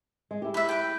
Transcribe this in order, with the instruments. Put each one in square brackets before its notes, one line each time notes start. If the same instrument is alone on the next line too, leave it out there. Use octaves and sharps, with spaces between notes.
[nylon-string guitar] G#3
E4 G4
[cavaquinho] B4 E5
B4 G5